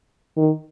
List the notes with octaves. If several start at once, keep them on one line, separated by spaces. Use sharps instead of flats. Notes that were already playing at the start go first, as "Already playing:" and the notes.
D#3